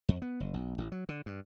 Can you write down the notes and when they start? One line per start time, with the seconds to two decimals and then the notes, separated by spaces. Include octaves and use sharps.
0.09 F2
0.22 B3
0.40 F#1
0.54 B1
0.78 A1
0.92 F#3
1.09 D3
1.26 G2